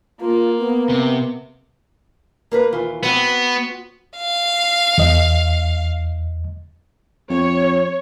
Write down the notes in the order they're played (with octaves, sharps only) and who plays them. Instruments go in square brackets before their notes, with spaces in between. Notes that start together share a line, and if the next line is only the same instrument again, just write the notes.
[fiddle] A#3 [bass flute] F4
[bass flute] B3
[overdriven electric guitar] C3
[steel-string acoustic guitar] A#3 A#4 B4
D#2 E3 F4
[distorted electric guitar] B3 [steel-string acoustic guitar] C4 F#4 F#5
[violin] F5
[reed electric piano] E2 D#5
[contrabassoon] F2 [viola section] C#5